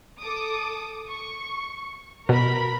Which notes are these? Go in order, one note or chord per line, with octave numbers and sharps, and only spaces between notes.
A4 D6 D#6
C#6
B2 A#4 B4 B5